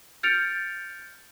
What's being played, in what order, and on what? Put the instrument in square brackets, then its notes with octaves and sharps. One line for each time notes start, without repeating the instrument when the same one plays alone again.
[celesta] F6 G6 A6 C#7 D7 F7